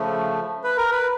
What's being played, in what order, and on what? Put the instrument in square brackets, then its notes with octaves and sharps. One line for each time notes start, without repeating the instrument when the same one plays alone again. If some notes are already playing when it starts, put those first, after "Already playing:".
Already playing: [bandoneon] C#3 F3 A3
B4
A#4
B4